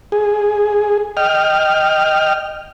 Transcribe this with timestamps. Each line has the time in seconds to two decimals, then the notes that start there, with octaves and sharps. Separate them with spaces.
0.12 G#4
1.17 D#5 G5 F6